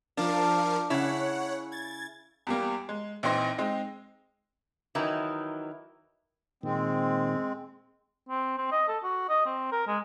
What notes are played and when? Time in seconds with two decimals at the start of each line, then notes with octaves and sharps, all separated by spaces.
0.17 F3 D4 A#4 F5
0.90 C#3 E4 C#5 F#5
1.72 G#6 A6
2.47 E2 G3 A#3
2.89 G#3
3.23 A#1 E3 C4 D#4 C6 A#6
3.58 G#3 C4 D#4
4.95 D#3 E3 F#3 D#4 E4
6.63 A#2 D#3 G#3 C4
8.29 C4
8.58 C4
8.72 D#5
8.88 A4
9.04 F#4
9.29 D#5
9.46 C4
9.72 A#4
9.87 G#3